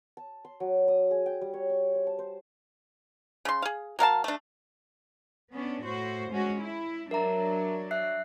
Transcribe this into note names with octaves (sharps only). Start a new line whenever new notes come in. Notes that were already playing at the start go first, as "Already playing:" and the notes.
A5
C6
F#3
D#6
G#4
G5
G3
C#5
C#6
C5
A5
C5
C#3 C6
G#4 F5
F#3 A#4 F5 A5
A3 D4
B3 C#4 D4
A2 F#4 C5
G#3 C#4 F#4
E4
F#3 D4 A#4 E5 A#5
E5 F#6 C7